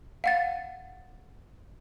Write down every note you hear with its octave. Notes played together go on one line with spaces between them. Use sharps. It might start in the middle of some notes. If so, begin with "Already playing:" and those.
F5 F#5 A6